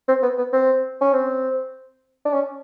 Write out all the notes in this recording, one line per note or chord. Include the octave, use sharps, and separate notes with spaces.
C4
B3
B3
C4
C#4
C4
D4
C#4